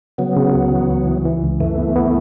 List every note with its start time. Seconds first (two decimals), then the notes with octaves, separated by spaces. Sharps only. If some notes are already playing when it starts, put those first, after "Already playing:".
0.18 C#3 F#3 B3
0.37 C#3
0.54 C#2
0.72 E3
0.90 C#2
1.07 E3
1.25 E3
1.43 C#2
1.60 F#2 E3 A3
1.78 B3
1.96 B3